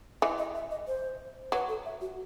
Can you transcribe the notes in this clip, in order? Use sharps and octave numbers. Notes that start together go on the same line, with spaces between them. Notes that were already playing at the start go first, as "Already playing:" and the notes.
E3 D#5
D#5
E5
D#5
C5
F#3 B4
A4
E5
F#4